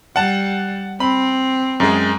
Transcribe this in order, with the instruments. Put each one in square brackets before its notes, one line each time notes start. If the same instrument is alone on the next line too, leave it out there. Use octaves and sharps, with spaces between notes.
[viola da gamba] G3 [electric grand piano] F#5 A5
[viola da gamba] C4 [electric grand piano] B5
[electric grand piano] F#2 G#3